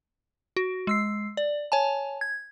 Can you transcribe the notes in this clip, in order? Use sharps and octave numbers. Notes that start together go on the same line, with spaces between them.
F#4
G#3 E6 C7
D5
C#5 G#5 A5
G#6